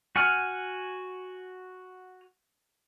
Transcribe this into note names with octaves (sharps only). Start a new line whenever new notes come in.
F#4 F#5 G#5 F6